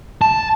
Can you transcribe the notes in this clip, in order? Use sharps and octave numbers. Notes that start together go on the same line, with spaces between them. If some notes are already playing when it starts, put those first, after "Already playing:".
A5